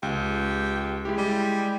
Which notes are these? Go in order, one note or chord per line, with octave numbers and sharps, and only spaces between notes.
C#2 G4
G#3 E4 G4
G3